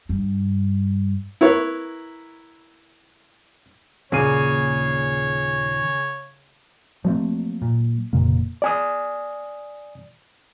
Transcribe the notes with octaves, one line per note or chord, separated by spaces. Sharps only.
G2
E4 A#4 B4 C#5
D#2 A#2 C#3 G#4 C#5 D#7
F3 F#3 A3 A#3 C4
A#2
F1 A#2 C#3 A#3
D5 G#5 D#6